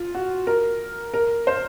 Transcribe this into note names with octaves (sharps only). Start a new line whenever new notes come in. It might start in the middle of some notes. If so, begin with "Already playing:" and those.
Already playing: F4
F#4
A#4
A#4
C5